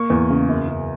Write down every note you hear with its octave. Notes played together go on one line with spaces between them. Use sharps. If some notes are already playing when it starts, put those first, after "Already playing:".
Already playing: A#3 C#6
E2
C#3
F#2
F#2